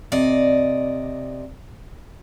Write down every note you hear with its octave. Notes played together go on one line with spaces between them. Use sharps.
C3 D5 D#5